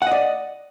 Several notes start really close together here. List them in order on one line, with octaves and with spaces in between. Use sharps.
F#5 D#5 D5